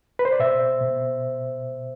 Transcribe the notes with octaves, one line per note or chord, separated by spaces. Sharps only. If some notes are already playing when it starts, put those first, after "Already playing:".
B4
C5
D5
B2 C5 E5
B2